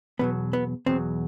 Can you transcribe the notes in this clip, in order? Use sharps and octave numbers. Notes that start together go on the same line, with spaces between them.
E2 B2 F#3 B3
B3
E2 B2 F#3 C4